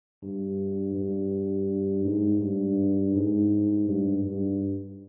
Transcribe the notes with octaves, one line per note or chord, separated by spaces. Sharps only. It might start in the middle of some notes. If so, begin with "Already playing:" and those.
G2
G2
G#2
G2
G#2
G2
G2